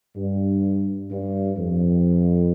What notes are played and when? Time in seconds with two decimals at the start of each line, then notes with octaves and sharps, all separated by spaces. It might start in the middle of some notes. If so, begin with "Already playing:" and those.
0.16 G2
1.11 G2
1.57 F2